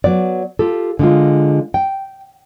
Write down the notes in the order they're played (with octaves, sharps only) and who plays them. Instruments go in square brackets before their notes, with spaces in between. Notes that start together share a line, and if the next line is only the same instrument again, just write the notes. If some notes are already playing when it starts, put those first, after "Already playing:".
[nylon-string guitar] F#3 B3 D5
F4 G4 A4
D3 G#3 F4
G5